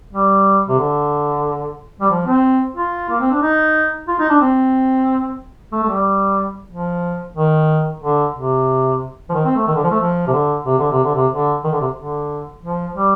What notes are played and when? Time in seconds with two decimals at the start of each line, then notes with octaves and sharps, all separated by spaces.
0.13 G3
0.69 C3
0.79 D3
2.01 G3
2.11 F3
2.27 C4
2.76 F4
3.10 A#3
3.21 C4
3.31 D4
3.42 D#4
4.08 F4
4.20 D#4
4.29 D4
4.41 C4
5.73 A3
5.83 A3
5.89 G3
6.71 F3
7.37 D#3
8.02 D3
8.36 C3
9.30 F3
9.34 D#3
9.45 C4
9.56 A3
9.67 D#3
9.75 D3
9.84 F3
9.91 A3
10.00 F3
10.27 C3
10.33 D3
10.66 C3
10.78 D3
10.91 C3
11.03 D3
11.15 C3
11.31 D3
11.64 D#3
11.73 D3
11.81 C3
11.97 D3
12.63 F3
12.96 G3